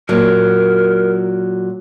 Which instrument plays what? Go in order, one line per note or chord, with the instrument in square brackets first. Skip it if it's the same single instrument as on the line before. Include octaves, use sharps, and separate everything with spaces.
[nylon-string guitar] A#2 F#3 [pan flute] A#4